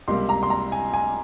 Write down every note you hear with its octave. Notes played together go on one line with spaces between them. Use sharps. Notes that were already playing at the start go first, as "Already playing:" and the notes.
C#2 C3 G3 A#3 C6
A#5
C6
A#5
G#5
G#5